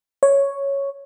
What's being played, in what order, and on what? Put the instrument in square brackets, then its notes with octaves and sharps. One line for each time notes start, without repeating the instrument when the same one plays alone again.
[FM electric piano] C#5